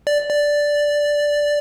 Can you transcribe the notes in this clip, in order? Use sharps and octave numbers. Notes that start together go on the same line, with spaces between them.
D5
D5